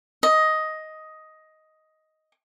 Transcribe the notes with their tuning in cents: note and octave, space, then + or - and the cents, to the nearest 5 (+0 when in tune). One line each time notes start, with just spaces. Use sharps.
D#5 +10